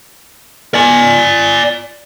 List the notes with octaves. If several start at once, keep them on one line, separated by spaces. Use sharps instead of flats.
D5 G#5